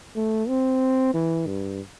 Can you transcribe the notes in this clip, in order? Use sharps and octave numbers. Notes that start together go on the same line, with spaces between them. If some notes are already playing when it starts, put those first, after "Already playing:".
A3
C4
E3
G2